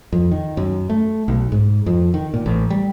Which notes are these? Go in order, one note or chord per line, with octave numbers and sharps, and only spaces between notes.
F2
D#3
F#2
A3
B1
G#2
F2
D#3
A#2
A1
G3